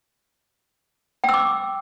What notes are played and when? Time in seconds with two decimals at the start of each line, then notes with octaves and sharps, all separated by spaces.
1.24 G5
1.29 E6
1.34 D6